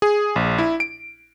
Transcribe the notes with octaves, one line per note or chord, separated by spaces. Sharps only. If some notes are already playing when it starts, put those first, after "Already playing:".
G#4
A#1
E4
D7